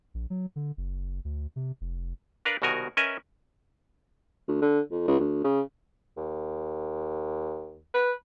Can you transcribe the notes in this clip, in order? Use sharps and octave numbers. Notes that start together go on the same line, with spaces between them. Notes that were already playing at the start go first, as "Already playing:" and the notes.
A#1
F#3
D3
F#1
D2
C3
F1
D4 A#4 B4 D5 F5
C2 B2 D#3 F#4 A#4 G#5
C#4 A#4 B4 D#5 E5 G#5
D2
D3
F2
C#2
D2
C#3
D#2
B4